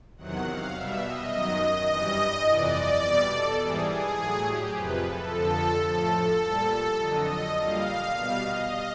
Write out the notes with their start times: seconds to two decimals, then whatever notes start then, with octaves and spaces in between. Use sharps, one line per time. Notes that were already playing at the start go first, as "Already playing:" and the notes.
0.18 E2 C3 D#3 F#3 F#5
0.46 F5
0.74 B2 G3 E5
1.03 D#5
1.31 F#2 D#3 F#3
1.59 D#5
1.88 G2 E3 G3 D#5
2.45 F2 C3 E3 D5
3.02 B2 G3
3.30 A4
3.59 G#2 E3 G3 G#4
3.87 G#4
4.15 A2 F#3
4.43 G4
4.72 F2 C3 F3 B4
5.01 A4
5.29 F2 D3 F3
5.86 A2 F3 A4
6.15 A4
6.43 A#2 G3
6.71 A4
7.00 F2 D3 F#3 D#5
7.56 A#2 G3 F5
8.13 B2 G3 F5
8.42 D#5